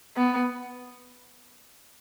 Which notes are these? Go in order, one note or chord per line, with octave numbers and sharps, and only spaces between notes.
B3